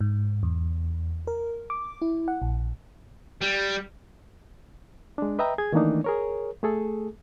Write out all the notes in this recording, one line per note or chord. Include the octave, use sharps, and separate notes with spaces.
G#2
E2
A#4
D6
E4
F#5
A#1
G3
G#3 D4
B4 D#5 E5 G5 A#5
G#4 G#6
D#3 E3 A3 A#3 D4 D#4
G#4 A#4 C#5
A3 G#4 A4